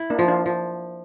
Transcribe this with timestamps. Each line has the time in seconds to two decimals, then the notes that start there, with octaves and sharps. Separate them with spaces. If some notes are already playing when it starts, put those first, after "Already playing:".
Already playing: E4
0.10 A#3 D4
0.19 F3
0.28 D4 F4
0.46 F3